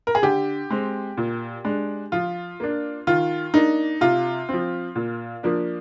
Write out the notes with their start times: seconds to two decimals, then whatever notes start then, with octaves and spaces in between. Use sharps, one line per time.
0.07 A#4
0.15 G#4
0.22 D3 G4
0.70 G#3 C4
1.17 A#2
1.64 G#3 D4
2.12 F3 F4
2.60 A#3 D4
3.07 D#3 F4
3.54 A#3 D4 D#4
4.01 C3 F4
4.49 F3 C4
4.95 A#2
5.43 F3 A#3 D4